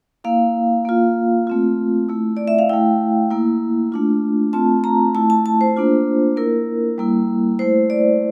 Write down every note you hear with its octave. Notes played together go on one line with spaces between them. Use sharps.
A#3 E4 F5
A#3 F4
A3 C4 F4
A3 E4
D5
E5
F5
A3 E4 G5
A#3 E4
A3 D4 F4
A3 C4 F4 A5
A#5
A3 E4 A5
A5
A5
C5
A#3 D4 F4
A#3 E4 A#4
G3 A#3 E4
A3 E4 C5
D5